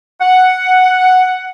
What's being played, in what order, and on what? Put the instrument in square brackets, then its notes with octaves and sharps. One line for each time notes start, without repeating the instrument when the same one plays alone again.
[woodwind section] F#5